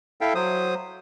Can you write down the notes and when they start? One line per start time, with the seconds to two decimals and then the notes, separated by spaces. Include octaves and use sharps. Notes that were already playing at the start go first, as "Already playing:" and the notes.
0.21 E4 A4 E5 F5 G5
0.35 F#3 C5 D#6